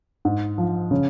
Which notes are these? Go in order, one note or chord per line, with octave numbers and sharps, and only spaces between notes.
G#2
F3
C#3